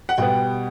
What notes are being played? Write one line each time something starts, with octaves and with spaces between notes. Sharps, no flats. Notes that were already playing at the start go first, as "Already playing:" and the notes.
F#5
B2 G3 B3 G5